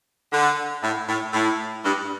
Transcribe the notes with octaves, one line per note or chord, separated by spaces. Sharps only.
D3
A2
A2
A2
G2